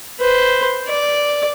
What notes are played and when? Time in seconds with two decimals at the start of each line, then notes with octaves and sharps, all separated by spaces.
0.20 B4 C5
0.88 D5